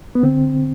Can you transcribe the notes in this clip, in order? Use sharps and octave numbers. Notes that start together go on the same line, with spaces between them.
B3
D3 C4